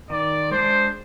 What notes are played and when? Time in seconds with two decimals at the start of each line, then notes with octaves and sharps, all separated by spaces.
0.10 D#3 D5
0.51 G#3 D4 C5